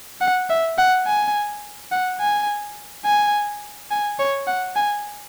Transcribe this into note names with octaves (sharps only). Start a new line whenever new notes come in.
F#5
E5
F#5
G#5
F#5
G#5
G#5
G#5
C#5
F#5
G#5